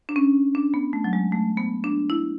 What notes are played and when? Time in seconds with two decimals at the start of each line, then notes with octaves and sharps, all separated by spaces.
0.09 D4
0.16 C#4
0.55 D4
0.74 B3
0.93 A3
1.04 F#3
1.13 G#3
1.32 A3
1.57 B3
1.84 D4
2.10 E4